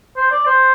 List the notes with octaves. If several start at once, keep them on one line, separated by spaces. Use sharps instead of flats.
C5
D5
C5